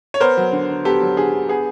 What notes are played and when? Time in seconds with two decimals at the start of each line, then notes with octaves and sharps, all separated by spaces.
0.14 C#5
0.20 B3 A#4 C5
0.37 F#3
0.52 D3
0.69 D3
0.85 B3 G4 A4
1.02 F#3
1.17 D3 G#4
1.33 D3
1.49 B3 G#4